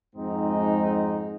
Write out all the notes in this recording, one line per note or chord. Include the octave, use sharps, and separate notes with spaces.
F2 G#2 G#3 C4 D#4